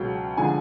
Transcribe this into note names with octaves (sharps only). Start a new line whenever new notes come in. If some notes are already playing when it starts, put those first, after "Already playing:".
Already playing: C#2 B2 F#3 G5
D3 F3 G#3 G#5